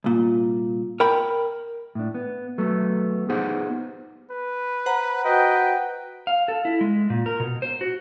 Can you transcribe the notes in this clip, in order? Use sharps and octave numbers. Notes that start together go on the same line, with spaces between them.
C2 A#2
A#4 G5 B5
A2 D4
B3
F#3 A3 B3
B3 D#4 G4 G#4 C5 F#5
B4
C5 F#5 A#5
F#4 B4 D#5 G5
F5
A4
E4
G#3
A#2
A#4
B2
C5
F#4